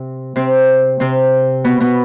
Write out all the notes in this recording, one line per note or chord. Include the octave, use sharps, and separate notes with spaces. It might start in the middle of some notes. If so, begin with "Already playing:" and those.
Already playing: C3 C4
C3 C4
C3 C4
B2 B3
B2 B3